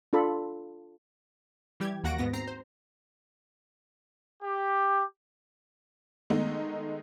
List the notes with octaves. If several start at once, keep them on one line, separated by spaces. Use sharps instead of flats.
D4 F4 A4 B5
E3 G3 G4 G5 G#6
D#2 A#3 F#4 F#5 A#6 D7
G#2 B3 A#6
C4 A#5 C7
C5
G4
D#3 G#3 A3 B3 D#4